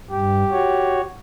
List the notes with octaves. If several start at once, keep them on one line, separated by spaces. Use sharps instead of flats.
G2 G4
F#4 C#5